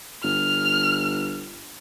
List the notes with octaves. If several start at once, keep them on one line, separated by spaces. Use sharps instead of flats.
G1 F6